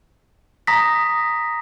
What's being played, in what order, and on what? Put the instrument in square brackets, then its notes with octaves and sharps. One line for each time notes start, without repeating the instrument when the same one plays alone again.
[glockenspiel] A#5 D#6 A#6 B6